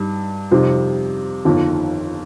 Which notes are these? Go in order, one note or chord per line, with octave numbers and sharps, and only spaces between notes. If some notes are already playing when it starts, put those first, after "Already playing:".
Already playing: G2 G3 D#4
F2 C3 G3 D#4 C5
G1 F2 D#3